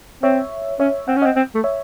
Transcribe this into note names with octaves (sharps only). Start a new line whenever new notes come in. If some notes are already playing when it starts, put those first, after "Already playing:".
C4 C#5 E5
C#4 C#5 E5
C4 F#5
C#4
C4 D#5 F#5
C4
A3
C#5 E5